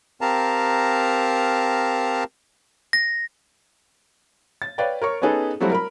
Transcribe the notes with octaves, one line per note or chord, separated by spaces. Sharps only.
C4 G4 A#4 F5 A5 A#5
A#6
A6
B4 C#5 D5 F5 G5
A#4 C#5 C#6
B3 C#4 D#4 G#4 A4 B4
F#3 G3 A3 C4 E4 F#4
A#4 B5